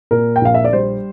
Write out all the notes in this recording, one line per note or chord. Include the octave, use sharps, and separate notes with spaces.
A#2 A#4
G5
A#1 F5
E5
D5
G3 C5